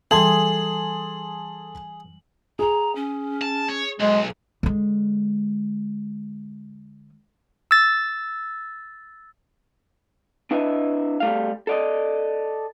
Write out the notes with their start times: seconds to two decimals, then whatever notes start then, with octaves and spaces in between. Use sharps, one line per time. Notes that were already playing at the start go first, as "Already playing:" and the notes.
0.11 E3 G3 G#4 A4 A5 C6 F#7
2.59 G#4 A#5
2.95 C#4
3.42 A5
3.69 C#5
4.00 B1 G#3
4.63 D3 G#3
7.71 E6 A6
10.51 D4 E4 B4 D#5 E5
11.20 G3 A3 F5
11.67 A4 D5 D#5